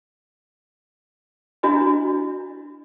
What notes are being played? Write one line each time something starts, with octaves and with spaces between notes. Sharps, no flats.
D4 E4 F#4 D#5 G#5